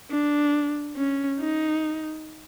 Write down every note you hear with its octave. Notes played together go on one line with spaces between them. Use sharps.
D4
C#4
D#4